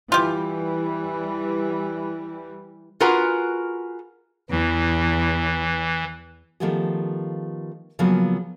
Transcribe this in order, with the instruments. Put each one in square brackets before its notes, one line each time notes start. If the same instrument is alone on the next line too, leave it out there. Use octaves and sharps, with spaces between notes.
[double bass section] E3 G3 [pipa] F4 G4
[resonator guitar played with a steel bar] F4 F#4 G#4 A#4 B4 F#5
[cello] E2 [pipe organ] E3
[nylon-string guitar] D#3 F3 A3 B3 G4 G#4
C#3 F3 F#3 A#3 B3 G#4